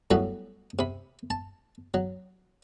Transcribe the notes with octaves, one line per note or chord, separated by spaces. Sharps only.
A2 F#3 G3 B3 F#4
C3 B5
A5
F#3